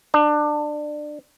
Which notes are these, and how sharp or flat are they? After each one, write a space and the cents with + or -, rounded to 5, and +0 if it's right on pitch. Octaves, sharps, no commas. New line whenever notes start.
D4 +25